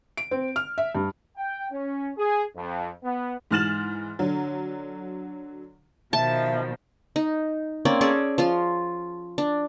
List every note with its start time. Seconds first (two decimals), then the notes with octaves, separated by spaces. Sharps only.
0.17 D7
0.31 C4
0.56 F6
0.78 E5
0.95 G2
1.37 G5
1.72 C#4
2.18 G#4
2.56 F2
3.04 B3
3.51 G#2 E3 F6 A6 E7 F#7
4.19 D3 F#3
6.13 B2 D#3 F3 E5 A5
7.16 D#4
7.85 A#3 C4 C#4 D5
8.01 C#4 G#4 A4 D5
8.38 F3 F4 C6
9.38 D4